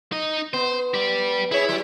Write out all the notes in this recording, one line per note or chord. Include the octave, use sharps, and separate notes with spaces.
D#4 D#5
B3 C5
G4 D5
E4 G#4 C#5
F#3